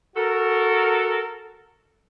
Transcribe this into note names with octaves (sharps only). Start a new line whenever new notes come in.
F#4 A4 A#4